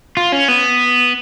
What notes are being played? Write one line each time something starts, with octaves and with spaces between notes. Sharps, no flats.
F4
C#4
B3